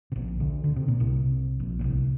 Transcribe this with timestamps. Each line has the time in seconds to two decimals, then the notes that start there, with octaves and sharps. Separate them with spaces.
0.12 C3
0.16 A#1 A#2
0.40 D2 D3
0.64 D3
0.76 C3
0.88 A#2
1.00 C2 C3
1.60 A#1 A#2
1.79 A#2
1.84 C2 C3